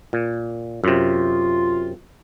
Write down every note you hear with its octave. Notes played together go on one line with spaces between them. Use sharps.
A#2
F#2 C3 F4